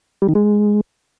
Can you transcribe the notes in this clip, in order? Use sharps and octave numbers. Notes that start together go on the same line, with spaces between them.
G3
D#3
G#3